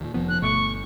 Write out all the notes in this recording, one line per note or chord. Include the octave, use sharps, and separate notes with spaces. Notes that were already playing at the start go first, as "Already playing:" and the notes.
D#2 A#2
F1 F3 B3
D2 F#6
G1 B2 A3 C#6 D6